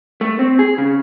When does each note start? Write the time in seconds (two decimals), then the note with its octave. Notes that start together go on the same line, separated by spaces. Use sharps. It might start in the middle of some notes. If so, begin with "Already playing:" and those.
0.21 A3
0.39 C4
0.59 G#4
0.78 C#3